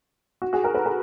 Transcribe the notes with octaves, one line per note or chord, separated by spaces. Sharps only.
F#4
F#4 G#4
G#4 A#4
A4 B4
G#4 A#4